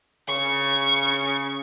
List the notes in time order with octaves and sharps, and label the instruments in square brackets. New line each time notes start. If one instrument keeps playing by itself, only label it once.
[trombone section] C#3 [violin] C#6